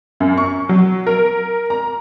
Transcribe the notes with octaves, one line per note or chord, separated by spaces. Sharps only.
F#2
C#6
F#3
A#4
A#5